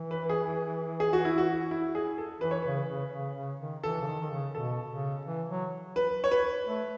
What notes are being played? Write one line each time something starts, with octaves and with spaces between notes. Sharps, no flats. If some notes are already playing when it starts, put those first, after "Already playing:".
Already playing: E3
B4
G#4
G#4
F#4
E4
F#4
E4
G#4
A4
E3 B4
C#5
C#3 B4
C#3
C#3
C#3
D#3
E3 A4
C#3
D#3
D#3
C#3
B2 A4
C#3
E3
F#3
B4
C#5
B4
A3